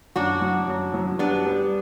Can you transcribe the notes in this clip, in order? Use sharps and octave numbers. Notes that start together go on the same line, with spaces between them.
F#2 D4 F#4
F#3
F#2
F#3
G3 B3 D4
G3